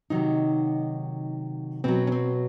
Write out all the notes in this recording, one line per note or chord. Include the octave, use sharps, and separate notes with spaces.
C3 D#3 F#3 D#4
B2 F#3 C4
C#4
C4